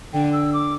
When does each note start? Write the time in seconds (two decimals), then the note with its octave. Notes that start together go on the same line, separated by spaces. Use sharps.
0.13 D3 G5
0.33 E6
0.53 D6